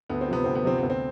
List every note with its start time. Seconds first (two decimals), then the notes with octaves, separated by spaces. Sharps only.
0.10 D2 B3
0.21 C4
0.28 C3 F3 B3
0.44 D2 C4
0.55 B3
0.65 C3 F3 C4
0.78 D2 B3
0.90 C4